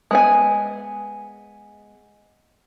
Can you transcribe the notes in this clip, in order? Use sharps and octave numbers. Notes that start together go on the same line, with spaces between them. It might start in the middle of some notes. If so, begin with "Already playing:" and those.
G#3 B3 G#5